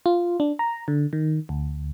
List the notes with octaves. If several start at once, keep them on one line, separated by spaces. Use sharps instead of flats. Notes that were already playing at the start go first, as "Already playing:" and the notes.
F4
D4
A#5
D3
D#3
D2